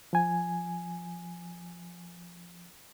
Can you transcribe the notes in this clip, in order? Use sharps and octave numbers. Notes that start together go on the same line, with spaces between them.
F3 G#5